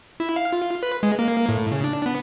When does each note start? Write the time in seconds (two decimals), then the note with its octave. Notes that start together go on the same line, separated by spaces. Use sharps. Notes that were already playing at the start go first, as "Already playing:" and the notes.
0.20 E4
0.36 F5
0.53 F4
0.83 B4
1.03 G#3
1.19 A#3
1.49 A2
1.72 C#3
1.84 D4
2.06 B3